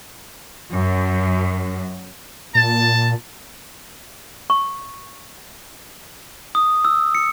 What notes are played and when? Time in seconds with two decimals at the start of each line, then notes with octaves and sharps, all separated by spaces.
0.73 F#2
2.55 A#2 A5
4.50 C#6
6.55 D#6
6.85 E6
7.15 C#7